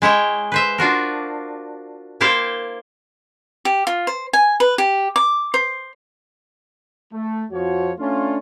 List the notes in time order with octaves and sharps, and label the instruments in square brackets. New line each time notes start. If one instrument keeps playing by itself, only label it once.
[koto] G#3 E4 C#5 G5
B4 C5 E5
D4 F4 F#4 A#4
A#3 E4 C5 D5 F5 G5
[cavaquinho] G4
F4
C5
G#5
B4
G4
D6
C5
[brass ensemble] A3
F2 F3 F#4 C#5
A3 C#4 D4 F4